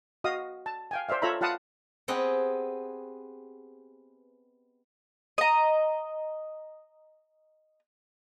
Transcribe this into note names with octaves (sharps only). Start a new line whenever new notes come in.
F#4 D#5 F5 D#6
A5
F5 G5 G#5
C5 D5 E5 F5
F4 A4 C#5 E5 A#5 B5
F4 F5 F#5 A5 B5 D#6
B3 C4 G4 G#4 B4 D#5
D#5 A#5